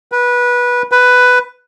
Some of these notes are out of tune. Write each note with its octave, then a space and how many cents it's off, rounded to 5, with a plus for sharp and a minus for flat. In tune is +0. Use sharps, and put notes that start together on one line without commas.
B4 -20
B4 +10